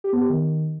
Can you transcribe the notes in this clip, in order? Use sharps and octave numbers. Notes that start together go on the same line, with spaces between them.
G4
B3
G4
D#3